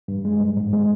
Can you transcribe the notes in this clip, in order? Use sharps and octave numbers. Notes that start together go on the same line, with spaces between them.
G2
G#3
G2
G#2
G#3